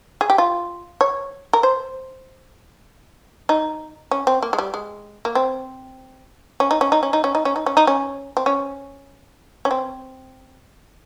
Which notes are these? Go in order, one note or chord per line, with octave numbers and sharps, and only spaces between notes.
G#4
G4
F4
C#5
A#4
C5
D#4
C#4
C4
A#3
G#3
G3
G#3
A#3
C4
C#4
D#4
C#4
D#4
C#4
D#4
C#4
D#4
C#4
D#4
C#4
D#4
C#4
C4
C#4
C#4
C4